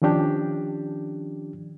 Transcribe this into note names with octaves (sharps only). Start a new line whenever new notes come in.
D#3 F3 C#4 D4 G4